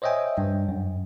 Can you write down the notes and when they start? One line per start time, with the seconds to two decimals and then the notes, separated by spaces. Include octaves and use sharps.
0.02 C5 C#5 D#5 E5 G5 G#5
0.38 G2
0.69 F#2